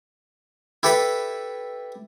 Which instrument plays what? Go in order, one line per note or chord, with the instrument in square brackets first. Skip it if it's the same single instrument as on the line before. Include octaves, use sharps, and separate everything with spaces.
[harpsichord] E4 G4 A4 B4 G5